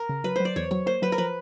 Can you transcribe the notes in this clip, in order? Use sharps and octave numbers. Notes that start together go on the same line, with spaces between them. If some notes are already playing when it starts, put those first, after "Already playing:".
Already playing: A#4
C#3
F#3 B4
F#3 C5
D5
E2 C#5
F#3 C#5
A#3 C5
F#3 B4
A#4
F3 B4